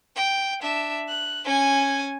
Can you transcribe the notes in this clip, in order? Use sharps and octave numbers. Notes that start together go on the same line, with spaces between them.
G5
D4 E5
F#6
C#4 G#5